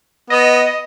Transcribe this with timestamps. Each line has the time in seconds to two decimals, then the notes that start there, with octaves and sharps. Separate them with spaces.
0.30 B3 D#5